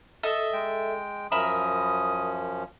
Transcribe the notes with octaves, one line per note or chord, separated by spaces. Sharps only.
A4 D#5 E5
G#3 G5
F#2 F3 C#4 A#4 E5 B5 D#6